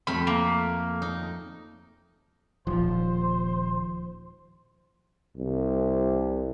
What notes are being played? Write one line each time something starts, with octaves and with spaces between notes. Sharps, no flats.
F2 A3 B5
A#3
D#4
D#1 F3 C5
C2